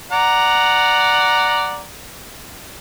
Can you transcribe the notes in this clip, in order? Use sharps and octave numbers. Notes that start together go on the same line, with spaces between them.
D5 F#5 A#5